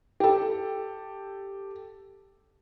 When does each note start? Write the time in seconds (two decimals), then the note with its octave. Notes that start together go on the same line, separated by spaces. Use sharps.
0.20 G4 A4